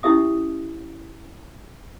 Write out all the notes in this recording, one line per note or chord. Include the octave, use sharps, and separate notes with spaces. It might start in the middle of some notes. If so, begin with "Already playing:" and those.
C#4 D#4 E4 G4 E5 D#6